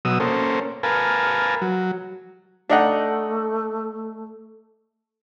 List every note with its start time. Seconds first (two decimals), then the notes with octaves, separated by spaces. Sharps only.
0.05 B2 F#3 D#6 E6
0.20 A#3 C#4 A4 C5
0.83 A#4 B4 F5 G#5 A5
1.62 F#3
2.70 A3 D4 D#4 F#5